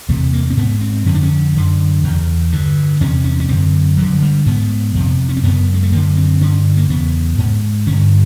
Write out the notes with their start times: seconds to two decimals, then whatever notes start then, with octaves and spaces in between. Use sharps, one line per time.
0.09 E2 C3 A3
0.33 A#3
0.50 C4
0.57 G#2 B3
0.81 C4
1.06 F2 D3 C#4
1.15 D4
1.23 C#4
1.55 F#2 D3
2.03 E2 C#3
2.52 G2 D3
3.01 E2 C3 C#4
3.24 C#4
3.40 C#4
3.49 F#2 D3 C4
3.97 G2 D3 F#3
4.22 G3
4.46 G#2 B3
4.95 F2 C3
5.29 C#4
5.37 C4
5.43 F#2 C#3 B3
5.74 G#3
5.83 A3
5.92 F#2 D3 A#3
6.17 C4
6.41 G2 D3 C#4
6.77 A#3
6.89 E2 C#3 B3
7.38 G#2
7.87 G2 D3 C#4